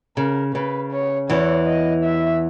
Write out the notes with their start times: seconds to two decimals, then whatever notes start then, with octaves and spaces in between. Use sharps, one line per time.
0.17 C#3 A#4
0.54 C#3 B4
0.92 C#5
1.29 E2 E3 C#5
1.67 D#5
2.04 E5